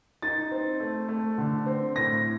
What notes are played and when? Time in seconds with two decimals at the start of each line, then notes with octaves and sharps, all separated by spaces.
0.22 D#4 A6
0.51 C4
0.80 A3
1.08 A3
1.38 D3
1.66 C4
1.95 A2 A#6